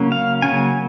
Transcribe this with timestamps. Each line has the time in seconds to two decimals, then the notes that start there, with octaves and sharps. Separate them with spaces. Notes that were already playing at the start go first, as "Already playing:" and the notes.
Already playing: C#3 F#3 A#3 C#4
0.12 F5
0.42 C#3 F#3 A#3 C#4 G#5